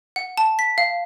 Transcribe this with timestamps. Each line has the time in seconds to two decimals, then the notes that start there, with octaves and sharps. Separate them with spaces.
0.16 F#5
0.37 A5
0.59 B6
0.78 F5